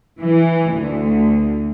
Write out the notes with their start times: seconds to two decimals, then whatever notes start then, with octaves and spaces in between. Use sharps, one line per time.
0.21 E3
0.74 D2